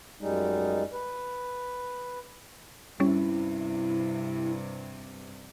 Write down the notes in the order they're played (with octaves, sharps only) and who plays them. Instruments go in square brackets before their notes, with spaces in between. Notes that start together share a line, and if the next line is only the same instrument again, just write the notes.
[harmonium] F#2 G3 G#3 D#4
B4
[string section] G2 C3 [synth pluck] G3 C#4 [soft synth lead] E4